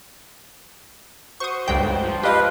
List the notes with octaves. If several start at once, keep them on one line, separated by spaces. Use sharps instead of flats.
F#4 C5 C#6 D#6
C#2 G2 A3 G5
G#2
F3
G4 B4 D#5 F5